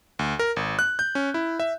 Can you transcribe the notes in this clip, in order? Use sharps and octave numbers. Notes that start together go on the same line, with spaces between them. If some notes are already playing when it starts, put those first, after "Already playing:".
D2
A#4
G#1
F#6
G6
C#4
E4
E5